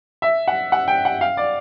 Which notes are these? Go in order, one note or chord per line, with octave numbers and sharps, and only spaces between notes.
E5
F#5
F#5
G5
F#5
F5
D5